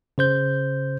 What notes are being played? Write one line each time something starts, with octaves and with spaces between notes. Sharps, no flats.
C#3 C5 G6